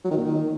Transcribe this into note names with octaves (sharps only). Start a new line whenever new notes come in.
F#3
D#3
A#2
D#3